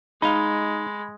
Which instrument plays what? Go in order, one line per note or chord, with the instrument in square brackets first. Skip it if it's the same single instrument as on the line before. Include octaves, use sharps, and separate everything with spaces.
[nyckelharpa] G#3 [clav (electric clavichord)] D#4 F5 [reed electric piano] B5